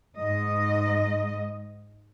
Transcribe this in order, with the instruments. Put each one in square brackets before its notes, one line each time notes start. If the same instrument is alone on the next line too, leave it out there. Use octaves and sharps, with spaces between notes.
[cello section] G#2 D#5